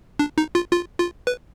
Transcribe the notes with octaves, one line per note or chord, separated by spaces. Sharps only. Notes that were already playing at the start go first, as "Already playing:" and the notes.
D4
D#4
F4
F4
F4
B4